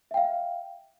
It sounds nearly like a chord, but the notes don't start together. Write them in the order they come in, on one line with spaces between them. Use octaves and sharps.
E5 G5 F5